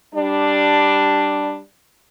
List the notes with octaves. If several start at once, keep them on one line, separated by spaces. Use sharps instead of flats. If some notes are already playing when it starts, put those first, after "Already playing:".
G3 D4